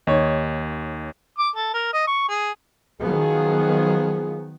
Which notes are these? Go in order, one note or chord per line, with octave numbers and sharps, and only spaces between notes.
D#2 D#4 C#5
D6
A4
A#4
D#5
C#6
G#4
D#3 F3 F#3 B3 G#4